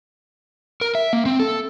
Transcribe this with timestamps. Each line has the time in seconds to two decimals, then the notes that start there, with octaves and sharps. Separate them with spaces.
0.81 A#4
0.95 E5
1.13 A#3
1.26 C4
1.39 A4